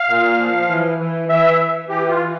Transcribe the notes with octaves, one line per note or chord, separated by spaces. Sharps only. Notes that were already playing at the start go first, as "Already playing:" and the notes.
Already playing: F5
A#2
F3
E3
E3
E3 E5
E3
E3 G4
F4
E3